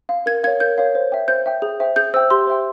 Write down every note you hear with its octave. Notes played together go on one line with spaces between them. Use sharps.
F5
A#4 G#6
C#5 F5 G#6
A#4 G6
C#5 F5
C5
E5 G5
C5 G6
E5 G5
G#4
C5 E5 G5
G#4 G6
C5 E5 G5 E6
G4 C6
C5 E5 G5